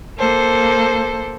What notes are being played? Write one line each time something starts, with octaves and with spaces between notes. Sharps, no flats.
A#3 A4 C5